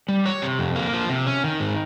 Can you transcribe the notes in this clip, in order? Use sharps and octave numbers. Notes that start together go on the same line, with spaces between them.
G3
C#5
C3
F2
A#3
F3
C3
C#4
D#3
G#2